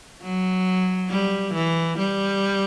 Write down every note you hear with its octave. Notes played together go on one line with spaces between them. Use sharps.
F#3
G3
E3
G3